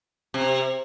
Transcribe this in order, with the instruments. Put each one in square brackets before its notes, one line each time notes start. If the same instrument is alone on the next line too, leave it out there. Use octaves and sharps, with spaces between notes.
[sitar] C3